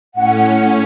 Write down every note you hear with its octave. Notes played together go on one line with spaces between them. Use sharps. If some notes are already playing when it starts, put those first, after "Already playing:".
A2 C#4 F#5